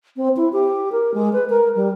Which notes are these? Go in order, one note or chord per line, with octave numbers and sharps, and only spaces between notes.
C4
E4
G4
A#4
G#3
B4
A#4
G3